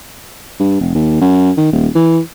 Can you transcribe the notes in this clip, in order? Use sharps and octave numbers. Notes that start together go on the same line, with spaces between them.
G2
F1
D#2
F#2
D#3
D#1
E3